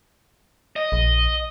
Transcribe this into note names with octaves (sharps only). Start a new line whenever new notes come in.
D#5
A#1